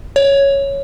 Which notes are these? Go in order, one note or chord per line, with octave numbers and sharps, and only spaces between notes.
C#5